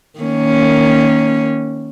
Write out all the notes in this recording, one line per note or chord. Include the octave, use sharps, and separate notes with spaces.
D#3 A#3 C#4